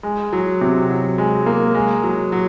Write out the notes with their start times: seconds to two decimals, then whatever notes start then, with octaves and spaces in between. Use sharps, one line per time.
0.03 G#3
0.33 F#3
0.61 C3
0.90 F#3
1.18 G#3
1.46 A#3
1.75 G#3
2.03 F#3
2.32 F#3